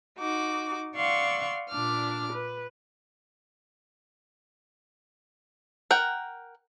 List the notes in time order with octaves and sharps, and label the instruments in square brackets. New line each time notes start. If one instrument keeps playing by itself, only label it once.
[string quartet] D#4 F#4 D6
D5 F5 F#5 C6 C#6 E6
A#2 D4 D6 F6
B4
[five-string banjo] A#4 F#5 G5